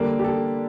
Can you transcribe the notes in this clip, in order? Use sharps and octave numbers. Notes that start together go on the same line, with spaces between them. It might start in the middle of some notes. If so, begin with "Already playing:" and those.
Already playing: D3 G3 A#3 D4 A4
G4
A4